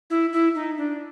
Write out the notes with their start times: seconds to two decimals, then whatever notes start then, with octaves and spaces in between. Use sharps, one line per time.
0.10 E4
0.33 E4
0.55 D#4
0.78 D4